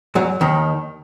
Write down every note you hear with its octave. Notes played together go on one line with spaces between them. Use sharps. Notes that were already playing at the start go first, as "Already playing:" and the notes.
F#2 F#3
D#2 D#3